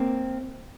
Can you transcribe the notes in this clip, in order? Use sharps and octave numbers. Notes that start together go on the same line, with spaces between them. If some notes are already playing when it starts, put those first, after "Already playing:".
Already playing: A#3 C4